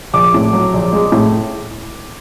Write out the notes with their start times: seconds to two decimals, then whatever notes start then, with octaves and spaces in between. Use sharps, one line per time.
0.13 A#1 D6
0.34 A2
0.53 F#3
0.74 A#1
0.93 G#3
1.12 A2